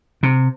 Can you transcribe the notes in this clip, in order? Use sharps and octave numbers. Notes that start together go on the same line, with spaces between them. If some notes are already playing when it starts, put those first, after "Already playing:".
C3